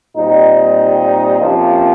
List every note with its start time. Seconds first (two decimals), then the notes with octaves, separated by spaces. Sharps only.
0.16 A#2 G3 C4 D#4
1.40 F2 C3 F3 A#3 C#4